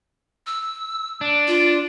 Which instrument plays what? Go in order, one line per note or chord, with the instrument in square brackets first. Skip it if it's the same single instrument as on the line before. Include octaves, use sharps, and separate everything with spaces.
[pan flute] E6
[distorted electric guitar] D4
[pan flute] F4